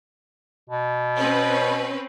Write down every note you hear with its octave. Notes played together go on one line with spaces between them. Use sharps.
B2
C4 C#4 B4